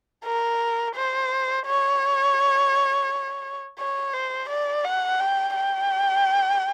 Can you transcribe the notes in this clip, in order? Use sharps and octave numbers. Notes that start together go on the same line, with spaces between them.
A#4
C5
C#5
C#5
C5
D5
F#5
G5
G5